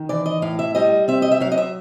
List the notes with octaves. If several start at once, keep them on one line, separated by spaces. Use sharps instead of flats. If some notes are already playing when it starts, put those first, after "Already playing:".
Already playing: D#3
E3 D5
D#5
A2 F5
E5
G3 D#5
C4 E5
D#5
E5
F#3 F5
D#5
E5